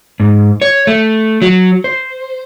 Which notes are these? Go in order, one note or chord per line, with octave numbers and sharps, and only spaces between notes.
G#2
C#5
A3
F#3
C5